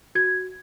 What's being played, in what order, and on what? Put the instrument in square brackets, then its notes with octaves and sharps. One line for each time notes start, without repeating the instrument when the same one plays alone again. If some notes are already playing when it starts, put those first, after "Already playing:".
[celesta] F#4 G#6